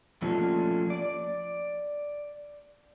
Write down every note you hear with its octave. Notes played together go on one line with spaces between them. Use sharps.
F3 A3 A#3 C#4 D4 F4
D5